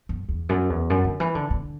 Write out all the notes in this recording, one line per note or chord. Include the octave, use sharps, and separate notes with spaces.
F#2
E2
F#2
E2
F#2
D3
E3
D3
D3